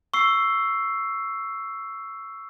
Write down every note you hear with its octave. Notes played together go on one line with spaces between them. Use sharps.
C#6 E6 C7